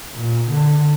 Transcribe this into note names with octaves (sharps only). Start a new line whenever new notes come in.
A#2
D3